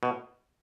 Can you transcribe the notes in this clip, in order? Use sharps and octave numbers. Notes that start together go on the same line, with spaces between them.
B2